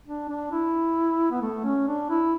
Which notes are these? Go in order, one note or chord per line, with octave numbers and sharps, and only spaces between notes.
D4
D4
E4
B3
A3
C#4
D4
E4